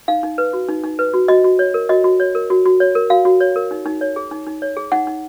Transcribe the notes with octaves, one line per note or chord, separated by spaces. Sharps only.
D#4 F5
D#4
B4
F#4
D#4
D#4
B4
F#4
F#4 D#5
F#4
C#5
A#4
F#4 D#5
F#4
C#5
A#4
F#4
F#4
C#5
A#4
F#4 F5
F#4
C#5
A#4
D#4
D#4
C#5
G#4
D#4
D#4
C#5
G#4
D#4 F#5
D#4